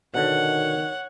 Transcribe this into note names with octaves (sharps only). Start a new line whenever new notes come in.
B2 D3 D#3 C#5 F#5